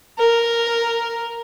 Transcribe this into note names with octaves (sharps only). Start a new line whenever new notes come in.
A#4